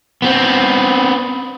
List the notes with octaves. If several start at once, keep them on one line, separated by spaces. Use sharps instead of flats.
B3 C4